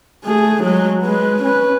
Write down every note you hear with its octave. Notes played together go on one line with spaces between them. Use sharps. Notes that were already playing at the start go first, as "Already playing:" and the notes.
A3 G#4
F#3 G#3
G#3 B4
C#4 B4